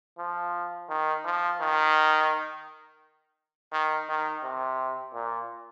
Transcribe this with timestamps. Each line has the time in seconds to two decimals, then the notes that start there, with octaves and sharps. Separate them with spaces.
0.18 F3
0.89 D#3
1.25 F3
1.60 D#3
3.73 D#3
4.09 D#3
4.43 C3
5.14 A#2